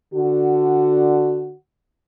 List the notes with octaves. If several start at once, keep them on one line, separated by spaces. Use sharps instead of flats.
D3 F#4